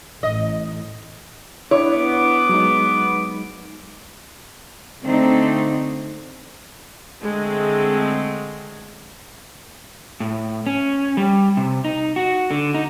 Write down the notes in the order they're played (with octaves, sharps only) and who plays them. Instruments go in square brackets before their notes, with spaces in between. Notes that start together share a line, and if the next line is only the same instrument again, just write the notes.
[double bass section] A1 [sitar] D#5
[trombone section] B3 [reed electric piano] D4 E4 [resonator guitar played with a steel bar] C#5 [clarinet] D6
[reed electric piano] F#3 G#3 D#4
[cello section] D3 A3 C4 D4 D#4
[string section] D3 G#3 A3 C4
[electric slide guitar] A2
C#4
G3
C3
D#4
F#4
D3
D#4